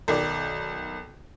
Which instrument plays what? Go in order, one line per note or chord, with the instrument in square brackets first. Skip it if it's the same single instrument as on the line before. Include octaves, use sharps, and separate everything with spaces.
[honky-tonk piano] B1 D#3 D5